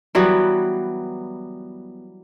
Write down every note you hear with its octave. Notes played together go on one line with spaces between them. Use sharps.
E3 F#3 G3 B3